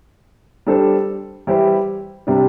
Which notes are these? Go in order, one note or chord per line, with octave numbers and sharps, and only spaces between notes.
G3 D4 A4 C5
E3 G3 E4 G4 C5
C3 G3 D4